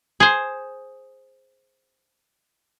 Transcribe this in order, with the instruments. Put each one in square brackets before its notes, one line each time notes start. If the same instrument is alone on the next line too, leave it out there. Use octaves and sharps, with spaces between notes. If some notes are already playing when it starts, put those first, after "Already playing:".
[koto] G#4 C5